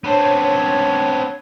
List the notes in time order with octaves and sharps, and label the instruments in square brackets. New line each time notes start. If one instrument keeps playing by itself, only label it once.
[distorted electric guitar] B3 C4 [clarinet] D4 [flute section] C#5